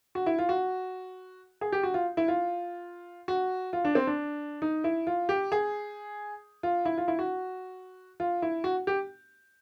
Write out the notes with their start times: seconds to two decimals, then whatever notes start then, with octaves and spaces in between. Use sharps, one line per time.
0.15 F#4
0.26 E4
0.38 F4
0.49 F#4
1.61 G#4
1.72 G4
1.83 F#4
1.94 F4
2.17 E4
2.28 F4
3.28 F#4
3.73 F4
3.84 D4
3.95 C4
4.07 D4
4.62 D#4
4.84 E4
5.07 F4
5.29 G4
5.52 G#4
6.63 F4
6.85 E4
6.98 F4
7.08 E4
7.19 F#4
8.20 F4
8.42 E4
8.64 F#4
8.87 G4